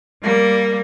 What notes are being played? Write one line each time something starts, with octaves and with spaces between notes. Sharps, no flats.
G3 A#3